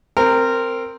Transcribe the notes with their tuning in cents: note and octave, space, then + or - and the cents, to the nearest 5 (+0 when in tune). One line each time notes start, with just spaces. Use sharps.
C4 +0 A#4 -15